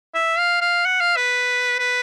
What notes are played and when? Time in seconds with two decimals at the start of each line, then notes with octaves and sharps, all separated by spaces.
0.14 E5
0.38 F5
0.61 F5
0.85 F#5
1.01 F5
1.16 B4
1.79 B4